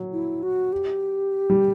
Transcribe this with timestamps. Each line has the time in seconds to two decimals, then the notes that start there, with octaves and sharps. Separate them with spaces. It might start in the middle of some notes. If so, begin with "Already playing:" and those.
Already playing: F#3
0.13 E4
0.43 F#4
0.73 G4
1.50 G3